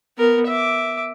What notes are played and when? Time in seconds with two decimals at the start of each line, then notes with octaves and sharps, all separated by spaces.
0.18 B3 A#4
0.47 E5 D6